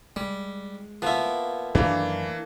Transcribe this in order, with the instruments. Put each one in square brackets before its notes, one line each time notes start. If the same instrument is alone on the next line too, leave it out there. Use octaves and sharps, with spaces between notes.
[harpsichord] G3 [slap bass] G#3
[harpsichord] F3 E4 [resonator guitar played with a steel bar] A#3 B3
[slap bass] F#2 D#3 A3 [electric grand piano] E3 [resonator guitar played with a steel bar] A#3 D4